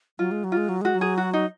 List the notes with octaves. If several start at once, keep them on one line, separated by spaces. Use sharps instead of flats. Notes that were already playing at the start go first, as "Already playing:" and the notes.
F#3 F4
G#3
F#3
F4
G#3
F#3
G#3 F#4
F#3
G#4
F#4
D#4